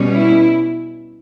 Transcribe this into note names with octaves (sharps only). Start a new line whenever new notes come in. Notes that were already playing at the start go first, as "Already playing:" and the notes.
Already playing: B2 G3 C#4
E4